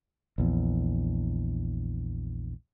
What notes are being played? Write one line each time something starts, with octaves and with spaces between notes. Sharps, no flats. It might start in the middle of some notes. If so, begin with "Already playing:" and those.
A#1 E2